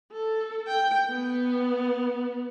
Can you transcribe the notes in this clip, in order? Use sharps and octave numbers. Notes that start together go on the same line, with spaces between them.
A4
G5
B3